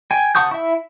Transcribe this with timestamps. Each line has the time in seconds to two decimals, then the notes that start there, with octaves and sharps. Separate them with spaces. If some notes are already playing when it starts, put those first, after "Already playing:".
0.11 G5 G#5
0.35 F#5 A5 C#6 D#6 G6
0.51 E4 E5